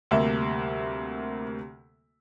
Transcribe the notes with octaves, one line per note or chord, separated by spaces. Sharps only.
D2 C3 G3 A#3 E5